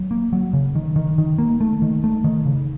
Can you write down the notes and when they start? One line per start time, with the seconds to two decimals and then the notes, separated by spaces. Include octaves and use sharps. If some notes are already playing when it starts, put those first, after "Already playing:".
Already playing: F#3
0.11 A#3
0.33 F#3
0.53 C#3
0.75 D#3
0.96 D#3
1.18 D#3
1.38 A#3
1.61 A3
1.82 D#3
2.04 A3
2.24 D#3
2.45 C#3